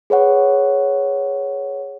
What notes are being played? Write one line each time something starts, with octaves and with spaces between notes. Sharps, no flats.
G#4 B4 C#5 F#5